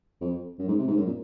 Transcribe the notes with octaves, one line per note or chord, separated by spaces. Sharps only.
F2
F#2
G#2
C3
G#2
F#2
A#2